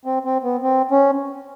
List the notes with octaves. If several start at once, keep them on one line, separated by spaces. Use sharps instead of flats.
C4
C4
B3
C4
C#4